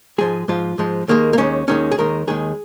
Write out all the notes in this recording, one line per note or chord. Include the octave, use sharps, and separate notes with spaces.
G#2 F3 G#3 G#4
G#2 F3 G#3 F4
G#2 F3 G#3
D#2 D#3 G#3 A#3
A#3
D#2 D#3 G#3 C#4
D#2 D#3 G#3 C#4
G#4
D#2 D#3 G#3 A#4
D#2 D#3 G#3 G#4